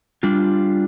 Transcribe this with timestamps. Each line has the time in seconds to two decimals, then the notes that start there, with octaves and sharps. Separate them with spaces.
0.23 G3 D4 F4